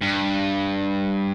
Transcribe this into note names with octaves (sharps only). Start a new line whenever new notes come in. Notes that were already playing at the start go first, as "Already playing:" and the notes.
G2